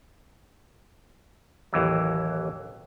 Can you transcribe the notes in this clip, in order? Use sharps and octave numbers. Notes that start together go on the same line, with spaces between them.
A1 D#2 E3 F#3